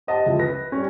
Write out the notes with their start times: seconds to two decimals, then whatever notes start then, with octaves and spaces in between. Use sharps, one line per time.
0.07 G4 C5 D#5 F#5 A5
0.26 C#2 F3 E4
0.39 B4 A#6
0.72 G3 C#4